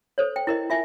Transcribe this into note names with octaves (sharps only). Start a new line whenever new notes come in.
A4 C5 C#5
G5
E4 A#4 D#5
F4 E5 G#5